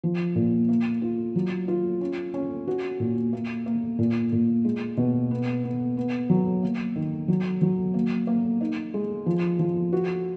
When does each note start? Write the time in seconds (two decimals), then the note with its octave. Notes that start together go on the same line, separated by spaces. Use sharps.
0.04 F3
0.35 A#2
0.69 A#3
1.02 F4
1.36 F#3
1.68 F4
2.01 C#4
2.34 C#4
2.67 F#4
3.00 A#2
3.33 A#3
3.66 A#3
3.99 A#2
4.32 A#2
4.65 G#3
4.97 B2
5.31 B3
5.64 B3
5.97 B3
6.30 F#3
6.63 A#3
6.96 D#3
7.28 F#3
7.62 F#3
7.94 A#3
8.27 A#3
8.61 D#4
8.94 G#3
9.26 F3
9.59 F3
9.93 F#4